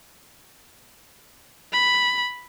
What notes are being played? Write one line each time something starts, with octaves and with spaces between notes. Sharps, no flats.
B5